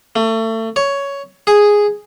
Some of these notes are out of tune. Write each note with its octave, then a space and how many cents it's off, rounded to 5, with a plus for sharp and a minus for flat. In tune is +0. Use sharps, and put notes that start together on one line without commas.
A3 +30
C#5 +10
G#4 -5